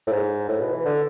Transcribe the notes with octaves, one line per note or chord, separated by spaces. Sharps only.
A2
G#2
A2
B2
E3
D3